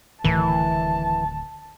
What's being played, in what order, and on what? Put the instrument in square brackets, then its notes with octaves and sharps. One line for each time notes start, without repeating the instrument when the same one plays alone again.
[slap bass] D1 A2 D#3 [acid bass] E3 [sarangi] A5